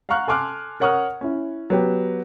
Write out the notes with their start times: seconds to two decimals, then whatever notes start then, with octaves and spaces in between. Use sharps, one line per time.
0.09 F5 F#5 A#5 C#6 F6 F#6
0.27 A4 G#5 C6 D6 F6 F#6
0.80 A#4 C#5 F#5 C#6 D#6 F6
1.21 C#4 E4
1.70 F#3 B3 G4